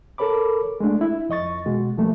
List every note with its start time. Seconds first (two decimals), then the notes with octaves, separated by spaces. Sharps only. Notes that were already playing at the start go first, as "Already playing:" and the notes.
0.18 A4 A#4 C#5 B5 D6
0.80 G#3 A3 D4
1.01 E4
1.29 F2 D#5 C#6 A6
1.66 B2 G#3 F#4
1.97 F3 G3 A3 A#3